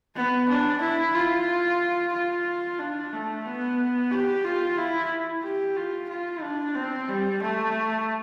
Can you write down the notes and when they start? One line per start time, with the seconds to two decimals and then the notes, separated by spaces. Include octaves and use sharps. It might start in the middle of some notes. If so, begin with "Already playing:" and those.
0.15 B3
0.48 D4
0.81 E4
1.14 F4
2.12 F4
2.79 D4
3.12 A3
3.45 B3
4.11 G4
4.44 F4
4.77 E4
5.43 G4
5.77 F4
6.09 F4
6.42 D4
6.75 C4
7.08 G3
7.42 A3